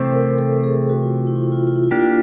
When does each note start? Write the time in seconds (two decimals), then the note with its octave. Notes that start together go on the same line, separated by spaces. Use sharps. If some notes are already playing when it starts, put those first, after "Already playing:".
Already playing: C3 E3 A3 C4 C5
0.13 A#4
0.38 A4
0.64 G#4
0.89 F#4
1.03 F4
1.15 F4
1.27 E4
1.36 F4
1.44 E4
1.52 F4
1.60 E4
1.67 F4
1.76 E4
1.83 F4
1.91 A#3 D4 E4 G4
1.99 F4